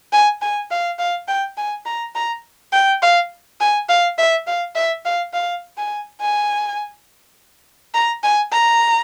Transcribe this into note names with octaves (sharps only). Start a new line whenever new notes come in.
G#5
G#5
F5
F5
G5
G#5
A#5
A#5
G5
F5
G#5
F5
E5
F5
E5
F5
F5
G#5
G#5
A#5
G#5
A#5